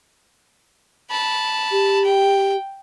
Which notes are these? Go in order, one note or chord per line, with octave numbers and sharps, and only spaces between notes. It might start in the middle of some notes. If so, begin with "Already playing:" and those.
A5 B5
G4
G5